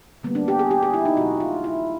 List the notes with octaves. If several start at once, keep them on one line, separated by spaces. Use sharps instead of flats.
D3 G3 A#3 B3
D4
G4
G#4
G4
G#4
E4
D#4
B2 F#3 A3 F#4
F4
E4